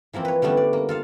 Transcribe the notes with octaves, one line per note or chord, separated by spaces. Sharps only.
E3 F3 A#3 C4
B4 C#5
D3 G3 A3 B3 C#4
D5
A#3
F4 A4 F5